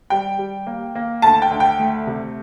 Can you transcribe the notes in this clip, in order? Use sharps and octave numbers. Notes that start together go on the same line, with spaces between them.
G3 G5
G3
A#3
A#3
D2 A5
G5
D2
G5
A3
C3